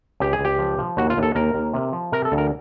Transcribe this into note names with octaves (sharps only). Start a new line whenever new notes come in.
C#2 G4
G#4
C#2
G4
F3
F3
D#2 F#4
F4
D#2
A4
D#2 A#4
D#2
C3
F3
C3 A#4
A4
D2
A#4